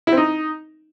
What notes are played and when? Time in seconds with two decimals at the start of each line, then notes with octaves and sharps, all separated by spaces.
0.07 E4
0.12 C4
0.17 D#4